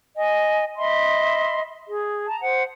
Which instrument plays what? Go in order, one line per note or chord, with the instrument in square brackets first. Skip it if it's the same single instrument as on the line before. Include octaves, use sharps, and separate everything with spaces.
[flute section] D#5 G#5
D#5 E5 B5 C6
G#4
A5 A#5
C5 F#5